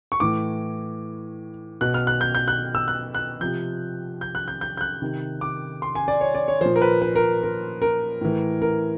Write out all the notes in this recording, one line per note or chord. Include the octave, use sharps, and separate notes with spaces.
C#6
A2 E3 D6
B2 F#6
F6
F#6
G6
G6
F#6
E6
F#6
F#6
C3 F3 G6
G6
F#6
G6
G6
G6
F#6
C3 D#3
D6
C6
G#5
D5
C#5
D5
C#5
A#2 F3 C5
A#4
B4
B4
A#4
A#4
A#4
A2 E3
A#4